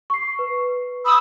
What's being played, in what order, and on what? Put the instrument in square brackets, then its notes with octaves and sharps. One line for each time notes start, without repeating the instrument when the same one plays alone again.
[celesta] C#6 C7
B4
[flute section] B5 D#6 E6